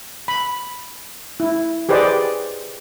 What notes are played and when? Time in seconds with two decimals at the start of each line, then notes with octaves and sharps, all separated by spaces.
0.28 B5
1.40 E4
1.89 G4 G#4 B4 C5 D5 D#5